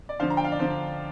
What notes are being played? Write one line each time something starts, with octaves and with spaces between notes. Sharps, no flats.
D5
D3 F3 D4 C5 F5
A#5
G5
F5
D5
D3 F3 D4 C5